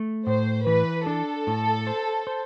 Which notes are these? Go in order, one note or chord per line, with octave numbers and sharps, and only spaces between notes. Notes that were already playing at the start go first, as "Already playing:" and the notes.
Already playing: A3
A2 C5
E3 B4
D4 A4
A2
C5
C5